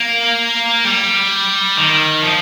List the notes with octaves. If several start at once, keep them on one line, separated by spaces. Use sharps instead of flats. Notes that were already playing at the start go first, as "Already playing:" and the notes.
Already playing: A#3
G3
D#3
F3